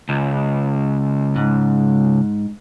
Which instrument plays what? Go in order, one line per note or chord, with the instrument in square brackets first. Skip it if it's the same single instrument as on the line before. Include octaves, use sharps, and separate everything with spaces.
[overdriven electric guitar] C#2
[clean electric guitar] G#2